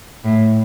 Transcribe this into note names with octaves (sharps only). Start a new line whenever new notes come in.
A2